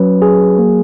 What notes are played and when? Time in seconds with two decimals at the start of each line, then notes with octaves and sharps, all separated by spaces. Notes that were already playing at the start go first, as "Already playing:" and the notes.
Already playing: F#3 C#4 B4
0.22 G#4
0.58 A#3